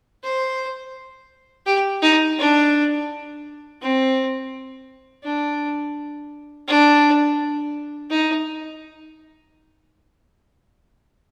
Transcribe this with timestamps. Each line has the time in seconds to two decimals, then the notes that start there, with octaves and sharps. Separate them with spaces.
0.24 C5
1.66 G4
2.02 D#4
2.39 D4
3.81 C4
5.24 D4
6.68 D4
8.10 D#4